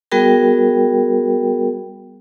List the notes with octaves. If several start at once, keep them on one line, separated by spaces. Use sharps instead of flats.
G3 B3 F#4 G#4 A#4 G5